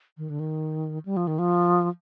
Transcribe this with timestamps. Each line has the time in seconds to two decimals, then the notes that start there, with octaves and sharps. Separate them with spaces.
0.18 D#3
0.30 D3
0.40 D#3
1.05 G3
1.17 F3
1.27 D#3
1.39 F3